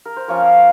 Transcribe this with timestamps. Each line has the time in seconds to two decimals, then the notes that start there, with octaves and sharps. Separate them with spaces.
0.06 A#4
0.17 C5
0.28 F3 A#3 C#4 F4 A#4 C#5